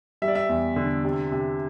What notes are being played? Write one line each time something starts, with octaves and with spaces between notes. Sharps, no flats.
G3 E5
D5
E5
E2
D3
C3
C3